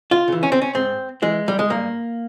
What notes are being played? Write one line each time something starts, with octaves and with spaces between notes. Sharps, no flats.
F4
C#3 E3
C#4
C4
C#4
G#2 C4
E3 G#3
G3
G#3
G2 A#3